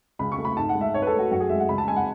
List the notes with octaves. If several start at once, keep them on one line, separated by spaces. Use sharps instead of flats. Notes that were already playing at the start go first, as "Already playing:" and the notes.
C#2 B5
C#6
A3
B5
G#2 A5
F#5
G#3
E5
G#2 C#5
B4
A4
A3
F#4
F#2 F#4
G#4
G#3 E5
F#5
C#2 B5
A5
G#3 G#5
F#5